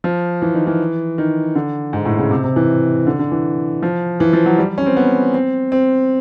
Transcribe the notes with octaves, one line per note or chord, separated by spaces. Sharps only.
F3
E3
D#3
E3
D#3
D3
G#2
A2
C#3
C3
C3
E3
D3
D3
E3
F3
E3
F3
F#3
G3
C#4
C4
B3
C4
C4